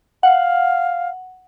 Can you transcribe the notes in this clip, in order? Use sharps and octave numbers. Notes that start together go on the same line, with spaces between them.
F5 F#5